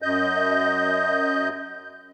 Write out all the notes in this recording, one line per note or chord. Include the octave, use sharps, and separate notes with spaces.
F#2 D#5 G6